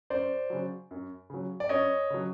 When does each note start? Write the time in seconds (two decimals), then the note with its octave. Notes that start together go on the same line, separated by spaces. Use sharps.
0.10 F#2 C5 D5
0.50 C#3 F#3
0.91 F#2
1.30 C#3 F#3
1.60 D5
1.69 F#2 C#5 D#5
2.10 C#3 F#3